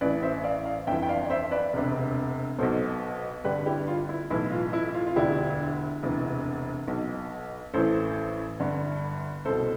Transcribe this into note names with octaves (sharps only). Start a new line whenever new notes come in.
A1 A2 E3 B4 D5
C5 E5
D5 F5
D5 F5
G1 F2 E3 E5 G5
G5
D5 F5
D5
C5 E5
B4 D5
E1 D2 C3
B1 B2 A4 C5
G1 G2 D3 G4 B4
E4 G4
F4
E4
B1 A2 E3 E4
F4
E4
F4
F4
E1 D2 D3 E4 G4
E1 D2 C3 E3
B1 B2
A1 A2 E3 A4 C5
G1 G2 D3
C2 B2 A4 C5